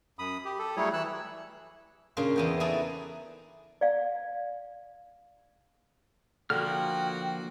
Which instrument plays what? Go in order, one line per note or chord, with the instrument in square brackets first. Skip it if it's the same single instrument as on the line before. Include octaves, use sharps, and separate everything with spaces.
[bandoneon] F#2 B5 D#6
G4
A4
F#3 G3 A3 E4 G#4 C#5
E3 E6 F#6
[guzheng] A#2 C#3 A#3 D4 C6
E2 B3 G5
D#4 E4 F#4 G#4 A4 D5
[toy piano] D5 F5
[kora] D3 [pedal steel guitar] F3 A#3 F6 [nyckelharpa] F#4 [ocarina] G5